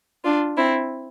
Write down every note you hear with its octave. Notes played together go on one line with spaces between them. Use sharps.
D4 F4
C4 E4